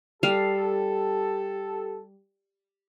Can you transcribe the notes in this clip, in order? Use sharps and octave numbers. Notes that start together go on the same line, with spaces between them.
G3 G4 A4 F5